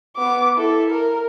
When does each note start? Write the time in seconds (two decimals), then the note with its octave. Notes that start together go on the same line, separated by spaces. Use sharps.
0.17 B3 D6
0.57 E4 A4
0.90 A#4